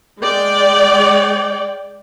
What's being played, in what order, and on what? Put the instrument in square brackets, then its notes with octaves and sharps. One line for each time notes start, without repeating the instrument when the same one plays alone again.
[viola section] G#3 D5 G5